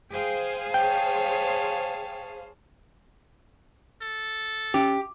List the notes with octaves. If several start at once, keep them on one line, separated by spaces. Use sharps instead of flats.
G#4 C5 F5 G5
C#5 G5 A5
A4
C#4 G4